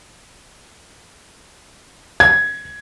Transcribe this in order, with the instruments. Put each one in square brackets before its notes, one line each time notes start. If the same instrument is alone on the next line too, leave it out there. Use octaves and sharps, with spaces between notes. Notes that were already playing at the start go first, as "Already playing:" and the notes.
[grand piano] G#6